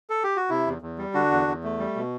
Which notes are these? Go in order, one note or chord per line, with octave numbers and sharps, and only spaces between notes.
A4
G4
F#4
C3 E4
E2
E2
G3
D3 D4 F#4
E2
E2
A3
G3
B2